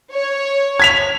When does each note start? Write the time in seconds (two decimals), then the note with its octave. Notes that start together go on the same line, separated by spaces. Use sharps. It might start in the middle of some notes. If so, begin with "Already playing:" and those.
0.13 C#5
0.80 G#6 B6 F7